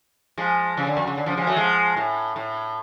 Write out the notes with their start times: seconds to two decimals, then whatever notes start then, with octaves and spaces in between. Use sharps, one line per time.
0.38 F3 G#3
0.77 C#3 F3
0.87 D3
0.97 F2
1.08 C#3
1.18 D3
1.26 C#3 F3
1.37 F3 G#3
1.47 F#3 A3
1.56 F3 G#3
1.96 A2
2.36 A2